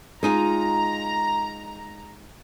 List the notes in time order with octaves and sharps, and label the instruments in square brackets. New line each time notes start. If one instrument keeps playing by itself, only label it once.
[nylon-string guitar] G#3 D#4 F4 [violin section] A#5